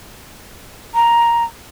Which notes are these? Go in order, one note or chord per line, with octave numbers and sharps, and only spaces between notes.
A#5